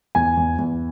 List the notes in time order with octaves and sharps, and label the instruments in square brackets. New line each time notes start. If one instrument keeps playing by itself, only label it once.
[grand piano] E2 G#5
E2
E2